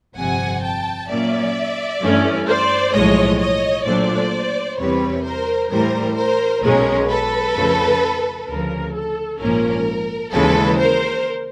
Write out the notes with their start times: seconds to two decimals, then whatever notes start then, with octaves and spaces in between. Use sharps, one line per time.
0.17 G1 F2 C3 F#5 G#5
0.62 G5 A5
1.08 A#2 F#3 A#3 C#4 D5 E5
2.01 G2 E3 A3 C#4
2.47 C5 D5
2.93 B1 A2 F3 G#3 C#5 D#5
3.40 C#5 D#5
3.85 A#2 F#3 A3 D4 C5 D5
4.78 E2 C3 E3 G3 C4 B4 C#5
5.25 A#4 C5
5.71 A2 E3 G3 A#4 C5
6.17 A#4 C5
6.62 B1 B2 G#3 C#4 A#4
7.09 A4 B4
7.56 F2 C#3 F3 A3
8.47 D2 C#3 F3 A#4
8.94 A4
9.39 A#1 G#2 F3 A#3 C#4 A#4
10.32 D#2 C#3 E3 G#3 A4 B4
10.78 A#4 C5